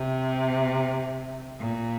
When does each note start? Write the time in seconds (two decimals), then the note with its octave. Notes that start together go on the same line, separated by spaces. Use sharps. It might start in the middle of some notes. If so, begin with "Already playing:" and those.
Already playing: C3
1.59 A#2